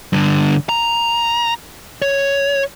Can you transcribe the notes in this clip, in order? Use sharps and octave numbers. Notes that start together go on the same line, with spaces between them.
G2 D3
A#5
C#5